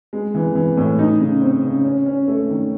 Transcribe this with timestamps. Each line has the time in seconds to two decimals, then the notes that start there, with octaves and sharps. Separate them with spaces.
0.13 G#3
0.35 E3
0.55 E3
0.77 A2
0.99 D#4
1.20 C#3
1.41 C4
1.63 C#3
1.84 C#4
2.06 C#4
2.28 A3
2.49 D#3